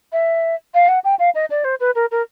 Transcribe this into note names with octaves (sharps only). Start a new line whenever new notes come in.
E5
F5
F#5
G5
F5
D#5
D5
C5
B4
A#4
A#4